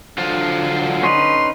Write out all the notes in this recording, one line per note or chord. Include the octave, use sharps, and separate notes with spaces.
D3 F#3 F4 C5
C#4 D#4 B4 C6